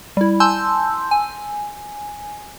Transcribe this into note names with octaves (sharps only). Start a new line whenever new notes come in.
G3 E4
G#5 A5 C6 E6 G6
G#5